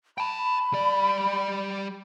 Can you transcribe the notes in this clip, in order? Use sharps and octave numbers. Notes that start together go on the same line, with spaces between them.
G5 A5 B5
G3 D5